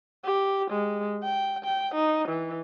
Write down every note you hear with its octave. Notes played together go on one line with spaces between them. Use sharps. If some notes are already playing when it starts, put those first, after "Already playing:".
G4
G#3
G5
G5
D#4
E3